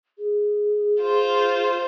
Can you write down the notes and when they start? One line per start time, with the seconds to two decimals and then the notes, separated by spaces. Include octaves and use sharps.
0.18 G#4
1.02 F4 C5